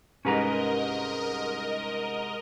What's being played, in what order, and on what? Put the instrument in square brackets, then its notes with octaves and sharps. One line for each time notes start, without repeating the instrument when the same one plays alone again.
[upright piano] C2 G#2 [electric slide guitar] C#4 B4 A#5 [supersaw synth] A#4 D#5